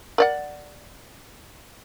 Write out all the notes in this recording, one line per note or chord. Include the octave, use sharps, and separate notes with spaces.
A#4 D5 F#5